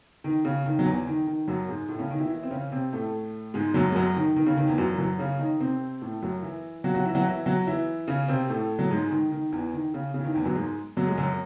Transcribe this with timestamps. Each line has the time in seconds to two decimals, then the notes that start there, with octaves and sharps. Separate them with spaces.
0.24 D#3
0.45 C#3
0.66 D#3
0.79 F#3
0.86 E2 E3
1.07 D#3
1.27 D#3
1.48 F#2 F#3
1.69 G#2 G#3
1.89 A2 A3
1.99 C#3 C#4
2.10 D#3 D#4
2.20 E3 E4
2.30 E3 E4
2.43 C4
2.51 C#3 C#4
2.72 C3 C4
2.93 A2 A3
3.54 G#2 G#3
3.74 F#2 F#3
3.92 G#3
3.96 F#2 F#3
4.16 D#3
4.36 D#3
4.46 C#3
4.57 D#3
4.68 E2 E3
4.78 F#2 F#3
4.93 E3
4.98 F#2 F#3
5.19 C#3 C#4
5.39 D#3 D#4
5.60 C3 C4
6.02 A2 A3
6.22 F#2 F#3
6.42 E3 E4
6.84 F#3 F#4
6.94 F#3 F#4
7.05 E3 E4
7.15 F#3 F#4
7.25 E3 E4
7.46 F#3 F#4
7.67 E3 E4
8.08 C#3 C#4
8.28 C3 C4
8.49 A2 A3
8.79 F#3
8.90 G#2 G#3
9.11 D#3
9.31 D#3
9.52 E2 E3
9.73 D#3
9.94 C#3
10.14 C#3
10.20 E3
10.25 D#3
10.35 E2 E3
10.45 F#2 F#3
10.56 G#2 G#3
10.97 F#2 F#3
11.07 G#3
11.18 F#2 F#3